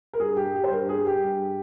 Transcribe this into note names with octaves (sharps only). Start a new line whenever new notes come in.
A#4
G2 G#4
G4
G3
G4
C5
G2 A#4
G#4
G3
G4
G2